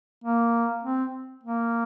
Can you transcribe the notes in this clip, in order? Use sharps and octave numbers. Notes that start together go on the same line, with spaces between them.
A#3
C4
A#3